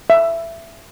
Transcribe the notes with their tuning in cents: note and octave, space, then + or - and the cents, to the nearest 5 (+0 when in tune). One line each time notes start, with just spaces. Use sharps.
E5 +15